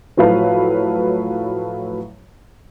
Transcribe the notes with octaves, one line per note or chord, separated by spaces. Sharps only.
A2 F3 F#3 A4 B4 F5